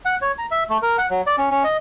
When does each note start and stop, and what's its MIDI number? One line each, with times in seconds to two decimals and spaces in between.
0.05 0.15 78
0.22 0.32 73
0.39 0.46 82
0.51 0.64 76
0.70 0.78 57
0.82 0.97 70
0.98 1.06 78
1.11 1.22 54
1.27 1.36 74
1.38 1.50 61
1.51 1.63 61
1.64 1.77 75